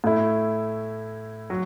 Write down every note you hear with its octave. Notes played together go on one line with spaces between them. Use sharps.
A2 A3 E4
F#3